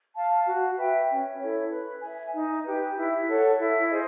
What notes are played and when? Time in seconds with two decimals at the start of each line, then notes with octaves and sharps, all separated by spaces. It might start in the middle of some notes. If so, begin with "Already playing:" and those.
0.15 F5 A5
0.46 F#4
0.76 B4 E5 G5
1.09 C#4
1.40 E4 A4 C#5
1.71 B4
2.01 E5 G#5
2.34 D#4
2.64 G4 B4
2.96 E4
3.27 A4 C#5 F#5
3.59 E4
3.90 G#4 C5 D#5